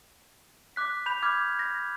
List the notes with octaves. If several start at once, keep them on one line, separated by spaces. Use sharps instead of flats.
D6 F#6 B6
B5 G6 F7
D6 F6 G6 G#6
A#6